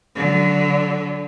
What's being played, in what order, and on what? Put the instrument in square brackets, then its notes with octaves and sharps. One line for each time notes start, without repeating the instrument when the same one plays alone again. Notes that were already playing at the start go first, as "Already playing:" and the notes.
[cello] D3 F#3